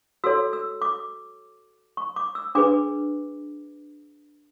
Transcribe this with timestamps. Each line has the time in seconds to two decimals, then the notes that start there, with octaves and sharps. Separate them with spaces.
0.24 F#4 A4 C#5 E6
0.53 E6
0.82 D6
1.97 C#6
2.16 D6
2.35 E6
2.55 D4 G#4 B4 D6